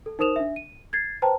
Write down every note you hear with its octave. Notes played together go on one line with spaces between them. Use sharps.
A4
D#4 A#4 C5 D#6 E7 F7
D4 E5
D#7
G#6 A6 C7
B4 C5 G5 A5 A#5